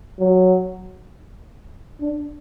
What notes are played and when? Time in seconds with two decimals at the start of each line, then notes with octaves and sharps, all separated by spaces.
0.19 F#3
2.00 D4